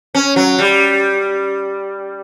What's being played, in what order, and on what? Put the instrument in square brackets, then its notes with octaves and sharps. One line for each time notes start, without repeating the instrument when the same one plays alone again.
[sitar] C#4
F#3
G3